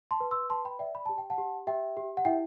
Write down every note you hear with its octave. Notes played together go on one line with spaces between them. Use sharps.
A5 C6
B4
C6 E6
B4 A5 C6
G5 B5
D5 E5 G5
B5
G4 A5
G5
F#5 A5
G4
G4 E5 G5
G4
F#5
E4 E5 G5